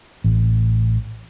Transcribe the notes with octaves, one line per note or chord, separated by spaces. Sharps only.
A1